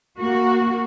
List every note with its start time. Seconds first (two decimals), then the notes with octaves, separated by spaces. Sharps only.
0.19 A#3 F#4